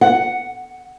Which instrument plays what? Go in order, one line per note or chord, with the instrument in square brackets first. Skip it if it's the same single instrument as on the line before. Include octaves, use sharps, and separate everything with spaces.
[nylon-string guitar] F#5